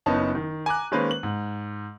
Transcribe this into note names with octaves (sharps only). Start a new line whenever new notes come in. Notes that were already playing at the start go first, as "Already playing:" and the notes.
F#1 B3 C#4 D#4 A5
D#3
G#5 A#5 D6 F#6
D#3 G#3 A#3 C#4 B4 C5
F#7
G#2